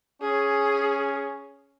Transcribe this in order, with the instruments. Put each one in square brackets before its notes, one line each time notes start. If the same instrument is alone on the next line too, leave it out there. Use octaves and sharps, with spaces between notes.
[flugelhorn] C#4 [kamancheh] G#4